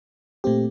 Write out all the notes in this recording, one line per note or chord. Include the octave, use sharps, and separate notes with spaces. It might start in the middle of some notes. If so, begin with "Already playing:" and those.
A#2 A3 C4 G4